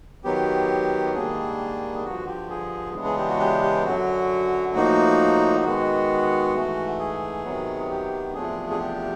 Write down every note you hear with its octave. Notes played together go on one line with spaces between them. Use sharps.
D#3 F#3 B3 G4
G#2 D#3 G3 A#3 D4 G#4
G2 D3 F3 F#4
G4
G#4
C#3 E3 G#3 B3 D4
G#4
G4
F#4
G4
G4
F#2 D3 F#3 F#4
A2 F3 A#3 D#4 F#4
D#3 G#3 B3 F#4
G#2 E3 A3
G#4
C3 D#3 F#3 B3
G4
E2 C3 F3 A3 D4 G#4
G#4
G4